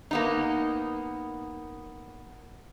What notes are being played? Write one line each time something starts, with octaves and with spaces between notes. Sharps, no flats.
A#3 B3 D#4